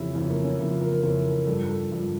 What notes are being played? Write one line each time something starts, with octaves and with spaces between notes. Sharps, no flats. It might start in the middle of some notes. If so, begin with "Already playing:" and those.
Already playing: F2 C#3 E3 E4 G4
F2 C#3 E3 C#4
A#3
C#4
F2 C#3 E3 E4
F4
A#4
A#4
F2 C#3 E3 A#4
A#4
G2 F3 A4
A4
G2 F3